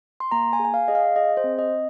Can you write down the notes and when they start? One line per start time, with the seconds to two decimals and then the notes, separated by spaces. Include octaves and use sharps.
0.20 C6
0.31 A#3 A#5
0.53 G#5
0.59 G#4
0.65 G#5
0.74 F5
0.88 G#4 D#5
0.95 F5
1.16 G#4 D#5
1.37 C5
1.44 C4
1.59 D#5
1.73 C4